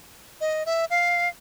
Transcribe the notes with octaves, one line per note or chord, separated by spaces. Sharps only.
D#5
E5
F5